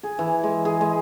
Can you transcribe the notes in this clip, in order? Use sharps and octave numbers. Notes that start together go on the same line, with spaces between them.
G#4
E3
G#3
G#4
G#3